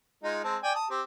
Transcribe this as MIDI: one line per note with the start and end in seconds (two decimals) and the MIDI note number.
0.24 0.43 56
0.24 0.43 63
0.24 0.43 65
0.44 0.57 56
0.44 0.57 60
0.44 0.57 81
0.63 0.73 74
0.63 0.73 79
0.63 0.73 80
0.75 0.86 81
0.75 0.86 87
0.90 1.02 60
0.90 1.02 67